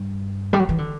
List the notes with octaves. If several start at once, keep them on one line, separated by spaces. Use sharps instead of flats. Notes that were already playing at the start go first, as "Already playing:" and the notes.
Already playing: G2
G3
F#3
E3
D3